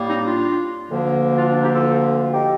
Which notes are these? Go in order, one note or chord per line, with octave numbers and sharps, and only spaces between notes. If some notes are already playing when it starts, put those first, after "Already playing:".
Already playing: A2 G3 A#3
C4 D#4
D4 F4
D2 D3 F3 A#3
D4 F4
D4
D#4 G4
F4 A4
F4
D#4 G4